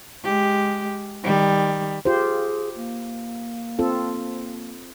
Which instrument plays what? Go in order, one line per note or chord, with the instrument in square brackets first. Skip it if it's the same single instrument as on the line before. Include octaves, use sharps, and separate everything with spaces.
[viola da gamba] G#3 G4
D#3 G3
[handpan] F4 G4 C5 [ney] G#4
[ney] A#3
[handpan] C4 F4 A4